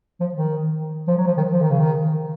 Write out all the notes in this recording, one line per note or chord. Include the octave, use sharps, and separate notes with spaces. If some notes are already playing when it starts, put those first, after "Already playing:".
F3
D#3
F3
F#3
F3
D#3
F3
D#3
C#3
D#3